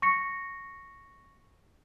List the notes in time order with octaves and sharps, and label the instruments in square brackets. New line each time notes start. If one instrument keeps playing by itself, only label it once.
[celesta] C#6 A#6 C#7